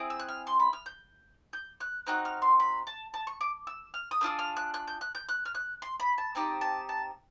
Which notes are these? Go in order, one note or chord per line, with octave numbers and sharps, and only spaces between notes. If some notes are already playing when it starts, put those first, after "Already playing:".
Already playing: C4 E4 G#4
E6
F#6
F6
C6
B5
F6
G6
G6
F#6
C4 D#4 F#4 F#6
F6
C6
B5
A5
A5
C#6
D6
E6
F6
D#6
A3 D4 F4 G#4 E6
F6
F#6
F#6
G6
F#6
G6
F#6
F6
F#6
C6
B5
A5
C4 D#4 G4 A5
A5
A5